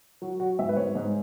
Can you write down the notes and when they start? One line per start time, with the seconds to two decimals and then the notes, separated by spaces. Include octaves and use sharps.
0.22 F#3 F#4
0.40 F#3 F#4
0.59 G#2 E5
0.69 B4
0.77 G#2 C#5
0.95 G#2